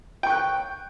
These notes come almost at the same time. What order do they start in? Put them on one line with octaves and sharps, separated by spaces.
G5 C#6 F#6